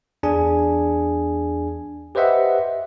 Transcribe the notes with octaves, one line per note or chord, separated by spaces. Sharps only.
E2 D4 G#4 G#5
G4 B4 C5 D#5 E5 F#5